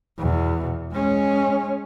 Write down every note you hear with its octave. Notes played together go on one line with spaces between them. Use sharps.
E2 B2
G#3 C#4